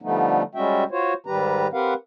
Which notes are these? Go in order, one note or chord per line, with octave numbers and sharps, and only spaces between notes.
D3 F3 G3 A3 B3 D#4
G3 G#3 C#4 F#4 E5 G5
F4 F#4 C5 C#5
G#2 D#3 G3 G4 B4 A#5
C4 G4 A#4 B4 F5 F#5